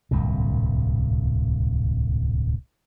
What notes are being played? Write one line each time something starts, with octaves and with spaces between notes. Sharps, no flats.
D1 C2 G2 A#2